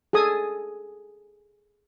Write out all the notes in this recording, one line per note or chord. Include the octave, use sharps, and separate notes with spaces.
G#4 A4 G#5 D#6